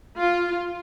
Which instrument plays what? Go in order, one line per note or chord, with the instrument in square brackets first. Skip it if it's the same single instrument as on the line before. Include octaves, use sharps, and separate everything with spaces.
[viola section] F4